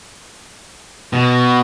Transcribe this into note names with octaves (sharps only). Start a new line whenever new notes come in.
B2